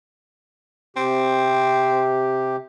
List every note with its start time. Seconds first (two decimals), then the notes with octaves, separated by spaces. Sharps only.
0.96 C3 C4 G4